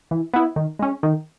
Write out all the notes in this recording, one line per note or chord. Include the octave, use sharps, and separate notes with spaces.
E3
B3 E4
D#3
G#3 C#4
D#3